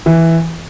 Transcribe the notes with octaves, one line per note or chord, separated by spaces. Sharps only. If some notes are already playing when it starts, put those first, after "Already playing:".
E3